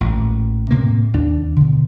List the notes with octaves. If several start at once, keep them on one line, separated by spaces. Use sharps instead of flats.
A1 A#2
A2 C3 A#3
D#2 D4
B2 D3